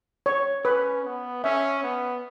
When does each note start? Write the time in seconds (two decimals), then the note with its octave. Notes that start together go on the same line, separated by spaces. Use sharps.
0.26 C#5
0.65 C#4 B4
1.05 B3
1.44 C#4 E5
1.83 B3